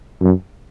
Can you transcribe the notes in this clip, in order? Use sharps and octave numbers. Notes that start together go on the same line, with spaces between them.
F#2